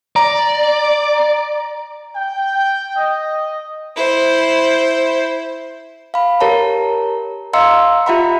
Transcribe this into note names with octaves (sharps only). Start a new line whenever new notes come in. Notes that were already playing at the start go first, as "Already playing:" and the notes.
D5 A#5
G5
D#5
E4 C5
F5 B5
G4 A#4 C#5 A5 A#5
D#5 F5 A#5 C6 E6 C#7
F4 G4 E5 F#5 A#5 B5